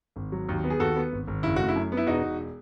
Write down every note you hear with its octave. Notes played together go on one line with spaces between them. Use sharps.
G#1
F#3
D#2
B3
G#4
D#2 F#4 A4
B3
G#1
G#1
F#1 E4
A3 F#4
E4
F#2
B3
E4
E1 D#4 F#4
E1